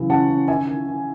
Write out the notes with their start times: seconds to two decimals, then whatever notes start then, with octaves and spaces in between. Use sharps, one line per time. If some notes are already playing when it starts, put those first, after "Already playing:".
Already playing: C#3 E3 F#3
0.10 C#4 F#5 A5
0.29 C#4
0.48 D#3 E5 G#5
0.67 D#3
0.86 D#3